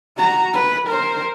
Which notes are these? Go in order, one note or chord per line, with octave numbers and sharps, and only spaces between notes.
F#4 A#5
B4
A#4 C5